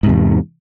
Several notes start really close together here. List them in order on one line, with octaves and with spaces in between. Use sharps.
G#2 C3 E2